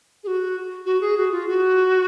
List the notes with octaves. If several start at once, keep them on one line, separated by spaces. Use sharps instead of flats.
G#4
F#4
F#4
G#4
F#4
F4
F#4